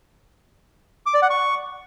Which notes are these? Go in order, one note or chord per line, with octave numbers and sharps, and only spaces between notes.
D6
D5
F#5
C#6